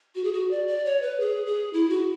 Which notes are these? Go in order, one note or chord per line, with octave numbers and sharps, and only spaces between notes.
F#4
G#4
F#4
D5
D5
C#5
B4
G#4
G#4
E4
F#4